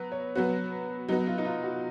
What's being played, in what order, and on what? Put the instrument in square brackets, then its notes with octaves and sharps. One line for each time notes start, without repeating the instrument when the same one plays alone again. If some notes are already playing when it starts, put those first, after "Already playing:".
Already playing: [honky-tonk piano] F#3 B3 [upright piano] B4
[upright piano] C#5
[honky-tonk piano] F#3 B3 F#4 [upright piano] B4
[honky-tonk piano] F#3 B3 F#4 [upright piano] D#4
[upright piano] F4
D#4
F4
F#4